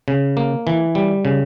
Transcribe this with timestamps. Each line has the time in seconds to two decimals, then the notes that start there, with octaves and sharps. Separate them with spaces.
0.08 C#3
0.37 A#3
0.67 E3
0.95 G3
1.25 C#3